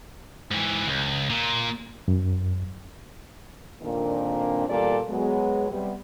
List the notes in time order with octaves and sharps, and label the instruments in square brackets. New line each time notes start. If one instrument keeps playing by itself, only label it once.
[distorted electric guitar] G#2 E3
C#2
A#2
[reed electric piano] F#2
[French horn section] F2 A#2 D#3 A#3 C4 D4
E2 A#2 G3 A#3 A4 D5
F#3 G#3 B3
C3 G3 B3